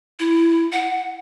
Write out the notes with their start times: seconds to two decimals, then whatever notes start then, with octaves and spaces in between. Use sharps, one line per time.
0.19 E4
0.72 F#5